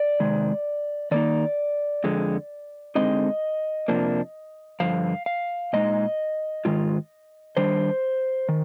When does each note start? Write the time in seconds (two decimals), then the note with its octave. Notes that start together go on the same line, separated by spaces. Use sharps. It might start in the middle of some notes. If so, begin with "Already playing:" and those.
Already playing: D5
0.20 C3 D#3 G#3
1.11 D#3 A#3 D#4 D5
2.04 F2 D3 G#3
2.95 D3 G#3 C4 D#4 D#5
3.88 F2 C3 F3 A#3 D4
4.80 G2 D3 F3 F5
5.26 F5
5.73 A#2 G#3 D#4 D#5
6.65 G#2 D#3 G#3 F4
7.57 D#3 G3 D4 C5
8.49 D#3